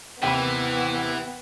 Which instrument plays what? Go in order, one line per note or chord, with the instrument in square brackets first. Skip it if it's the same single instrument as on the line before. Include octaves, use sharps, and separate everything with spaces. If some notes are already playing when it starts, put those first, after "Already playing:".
[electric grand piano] D#2 C3 [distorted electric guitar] E3 [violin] B3 [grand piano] G5 B5